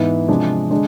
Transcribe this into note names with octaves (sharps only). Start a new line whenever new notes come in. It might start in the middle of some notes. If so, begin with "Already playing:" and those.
Already playing: G#2 E3 B3 E4
C3 F3 G#3 D4
D3 G#3 D4